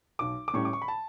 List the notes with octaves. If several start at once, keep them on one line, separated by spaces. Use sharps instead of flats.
B1 D6
D6
A2 G3 C#4 C#6
D6
C#6
B5
A5